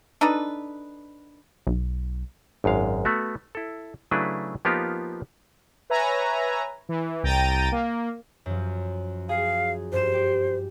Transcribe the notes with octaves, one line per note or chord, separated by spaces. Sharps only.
D4 D#4 A4 B4
B1
G#1 F#2 G#3 F5
A3 B3 F#4
E4 A4
C#3 F#3 A3 D4 E4 B4
F3 A#3 B3 D#4 F4 G4
B4 C#5 E5 G#5 A#5
E3
C2 G5 A#5 A6 D#7
A#3
F#2 F3
G#4 F5
G2 C5 E7
G4